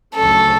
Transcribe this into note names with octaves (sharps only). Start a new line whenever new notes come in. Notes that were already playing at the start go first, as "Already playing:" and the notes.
D2 C#3 F#3 A3 C#4 A4